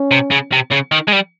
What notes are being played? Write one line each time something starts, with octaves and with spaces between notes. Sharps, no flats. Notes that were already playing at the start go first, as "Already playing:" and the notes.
Already playing: C#4
C3
C#3
C3
C#3
D#3
G#3
G3